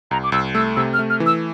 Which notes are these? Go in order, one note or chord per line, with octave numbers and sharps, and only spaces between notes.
C2 A#5
D6
C2 E6
A3 E6
C3 E6
F6
A3
F6
E3
E6